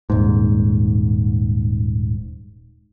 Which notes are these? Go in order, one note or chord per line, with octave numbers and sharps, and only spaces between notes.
D#1 G#2